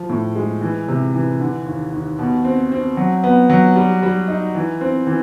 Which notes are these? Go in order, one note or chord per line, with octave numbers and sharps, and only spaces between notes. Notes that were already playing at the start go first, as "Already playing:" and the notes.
Already playing: F3
A2
G#3
E3
C3
E3
D3
D#2
D#2
B2
C4
C4
F#3
B3
F#3
G3
G3
D#4
E3
C4
E3